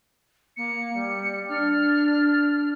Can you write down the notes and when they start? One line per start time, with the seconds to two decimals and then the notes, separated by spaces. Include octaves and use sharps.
0.57 A#3 C#7
0.93 G3
1.49 D4 F6